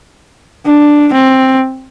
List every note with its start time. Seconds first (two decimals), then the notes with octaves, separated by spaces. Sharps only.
0.66 D4
1.14 C4